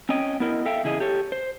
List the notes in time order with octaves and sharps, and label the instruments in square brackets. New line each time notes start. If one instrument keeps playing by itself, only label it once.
[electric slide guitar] C4 C#4 C#5 D#5 G5
B3 E4 A#4 D#5
A4 E5 F5 G5
E2 C#3 E4 G#4 D#5
G4 A4 C#5
C5